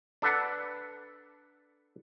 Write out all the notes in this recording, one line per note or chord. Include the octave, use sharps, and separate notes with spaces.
D4 A4 B4 F#5 A5